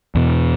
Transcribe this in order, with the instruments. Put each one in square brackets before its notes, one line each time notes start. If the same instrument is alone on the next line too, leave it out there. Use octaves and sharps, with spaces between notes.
[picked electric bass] E2 B2